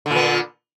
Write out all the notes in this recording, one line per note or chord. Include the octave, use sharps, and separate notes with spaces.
A#2 D3 B3